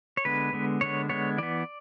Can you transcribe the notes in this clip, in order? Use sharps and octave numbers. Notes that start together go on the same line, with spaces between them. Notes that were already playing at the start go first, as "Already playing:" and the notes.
C#5
D3 G#3 B3 B4
D3 G#3 B3
D3 G#3 B3 C#5
D3 G#3 B3 C#5
E3 B3 D5